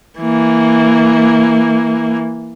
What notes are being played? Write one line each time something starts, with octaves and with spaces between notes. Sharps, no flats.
E3 A#3